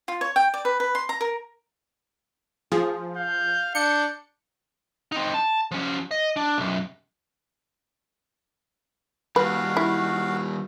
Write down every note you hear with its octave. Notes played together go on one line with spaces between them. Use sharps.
F4
C#5
G5
D5
B4
B4
C6
A#5
A#4
F3 G#4
F5 G6
D4 G6 C#7
C4 D#4
A5
F3 C#4
D#5
D4
B1 F#2
D#3 G3 F#4 B4 F5
E4